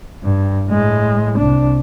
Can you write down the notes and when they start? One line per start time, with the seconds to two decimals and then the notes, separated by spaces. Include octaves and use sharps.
0.24 G2
0.67 A2 G#3
1.37 C2 D4